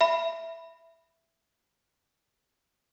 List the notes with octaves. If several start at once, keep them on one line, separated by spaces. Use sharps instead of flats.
E5 B5